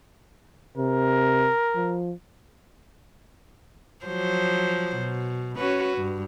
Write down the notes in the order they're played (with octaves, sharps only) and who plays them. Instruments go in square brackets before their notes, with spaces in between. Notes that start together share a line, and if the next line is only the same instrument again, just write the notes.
[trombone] C3 [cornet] A#4
[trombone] F3
[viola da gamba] F3 F#3 C5
B2
C#4 F#4 B4
G2